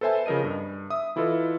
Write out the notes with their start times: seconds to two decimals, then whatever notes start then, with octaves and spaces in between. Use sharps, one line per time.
0.01 A4 B4 C5 E5 G#5 A5
0.26 C#3 F3 A#4 D#5 D#7
0.44 G2
0.90 E5 D#6
1.16 E3 E4 F4 A4 B4 D#5